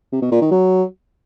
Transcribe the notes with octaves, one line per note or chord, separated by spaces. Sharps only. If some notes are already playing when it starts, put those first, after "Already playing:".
C3
B2
A#2
D#3
F#3